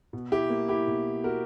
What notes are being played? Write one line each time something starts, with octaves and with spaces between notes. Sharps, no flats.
B2
E4 G4
A#3
E4 G4
B2
A#3 F#4 A#4